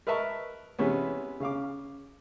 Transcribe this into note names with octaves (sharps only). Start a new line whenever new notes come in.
A#4 B4 D#5 E5 A5 C#6
C3 E3 G#3 B3 C#4
C#3 F5 D6